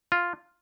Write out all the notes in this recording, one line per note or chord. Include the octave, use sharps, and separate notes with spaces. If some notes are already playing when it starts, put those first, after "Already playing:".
F4